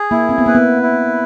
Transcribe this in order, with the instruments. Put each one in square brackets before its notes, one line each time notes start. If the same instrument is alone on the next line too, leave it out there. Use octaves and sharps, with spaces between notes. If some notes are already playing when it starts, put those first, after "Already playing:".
Already playing: [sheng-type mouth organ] G#4
[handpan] A#3 [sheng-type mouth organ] E4
[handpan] C4
B3
[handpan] A#3 [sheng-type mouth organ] B4
[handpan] B3
[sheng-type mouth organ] E4